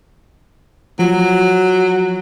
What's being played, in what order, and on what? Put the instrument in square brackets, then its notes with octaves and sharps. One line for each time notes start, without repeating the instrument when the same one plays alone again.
[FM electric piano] F3 [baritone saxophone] F#3